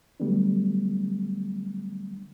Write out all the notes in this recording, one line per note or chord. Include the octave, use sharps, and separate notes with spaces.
D3 F#3 G3 A3 B3 D4